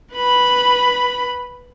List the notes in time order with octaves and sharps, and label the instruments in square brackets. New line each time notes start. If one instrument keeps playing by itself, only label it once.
[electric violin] B4 B5